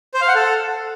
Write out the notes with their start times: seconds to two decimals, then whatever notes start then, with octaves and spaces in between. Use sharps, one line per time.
0.14 C5
0.21 F5
0.28 F#5
0.35 A4